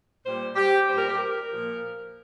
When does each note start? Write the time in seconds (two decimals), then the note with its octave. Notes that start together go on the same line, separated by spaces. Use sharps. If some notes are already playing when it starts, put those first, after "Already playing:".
0.24 A#2 G3 C5
0.56 G4
0.88 A#2 G3 C5
0.97 A#4
1.07 G4
1.17 A#4
1.51 A#2 F3